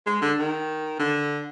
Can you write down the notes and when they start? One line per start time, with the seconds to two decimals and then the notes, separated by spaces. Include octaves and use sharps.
0.06 G#3
0.22 D3
0.39 D#3
0.99 D3